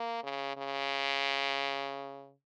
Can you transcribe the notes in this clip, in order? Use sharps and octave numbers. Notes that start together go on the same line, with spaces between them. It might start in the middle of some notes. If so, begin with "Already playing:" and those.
Already playing: A#3
C#3
C#3